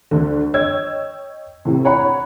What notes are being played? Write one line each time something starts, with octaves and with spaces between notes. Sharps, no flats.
D2 D3
C#5 D#5 G5 E6 G#6
A2 C3
C#5 F#5 A#5 B5